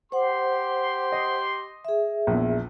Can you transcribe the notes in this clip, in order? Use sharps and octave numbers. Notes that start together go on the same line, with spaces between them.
G4 C5 F#5 C6
D#5
G#4 E5
A#1 E2